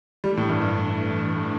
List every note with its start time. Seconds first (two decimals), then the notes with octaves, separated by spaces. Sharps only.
0.24 E3 G3 A3 D4
0.37 A2
0.49 G2
0.61 G2